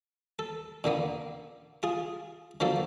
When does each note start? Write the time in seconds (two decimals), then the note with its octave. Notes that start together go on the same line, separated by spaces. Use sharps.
0.39 A4
0.84 A#2 D3 A#3 B3
1.83 F4 G#4
2.60 D3 F3 F#3 A#3 A4